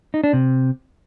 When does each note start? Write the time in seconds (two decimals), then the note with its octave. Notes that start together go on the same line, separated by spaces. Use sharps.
0.14 D#4
0.24 D4
0.33 C3